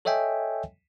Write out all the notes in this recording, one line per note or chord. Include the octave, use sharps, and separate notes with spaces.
A4 C#5 D#5 E5 G5 G#5